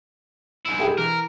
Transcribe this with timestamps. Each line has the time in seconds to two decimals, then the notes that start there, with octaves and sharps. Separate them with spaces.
0.65 G#2 E4
0.79 G#3 G4 G#4
0.98 E3 A#4